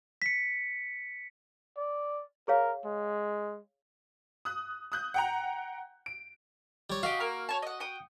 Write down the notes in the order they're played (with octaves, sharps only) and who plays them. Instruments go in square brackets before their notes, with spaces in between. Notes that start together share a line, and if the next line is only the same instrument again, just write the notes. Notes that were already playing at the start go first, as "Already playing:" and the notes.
[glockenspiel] B6 C#7
[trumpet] D5
[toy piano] G#4 C#5 F5 [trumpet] A#4
[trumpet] G#3
[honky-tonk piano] D#6 F#6
D#6 F#6 G6
F#5 G5 A#5
D7
[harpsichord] G3 C#5
[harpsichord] F#4 [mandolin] G4 D#5 F5
[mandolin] A#3 F6
C#5 A5
D#5 F#5
F#5 G5 D#6